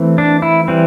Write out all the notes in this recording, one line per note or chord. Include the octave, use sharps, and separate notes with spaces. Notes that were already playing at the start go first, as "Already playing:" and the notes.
Already playing: E3 A3 C4
D4
E4
E3 G3 C4